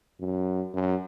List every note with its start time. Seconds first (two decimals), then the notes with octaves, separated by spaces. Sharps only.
0.20 F#2
0.74 F#2